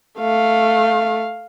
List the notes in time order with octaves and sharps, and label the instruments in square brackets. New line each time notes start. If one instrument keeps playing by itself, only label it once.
[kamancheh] A3 [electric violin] F5